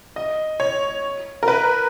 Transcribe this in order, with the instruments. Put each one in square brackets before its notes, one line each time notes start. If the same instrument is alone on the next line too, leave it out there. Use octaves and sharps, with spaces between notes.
[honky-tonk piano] D#5
C#5
A#4
B4